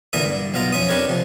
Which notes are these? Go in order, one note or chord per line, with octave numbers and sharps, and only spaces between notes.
A#2 D3 E3 A#4 E5 D#6
G2
B1 B2 F4 D#5 A#5
F2 C#4 E5 D#6
D4 D#4 G4 A#4 B4 C#5
C3 F3